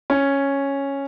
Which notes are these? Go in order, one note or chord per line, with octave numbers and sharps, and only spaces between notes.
C#4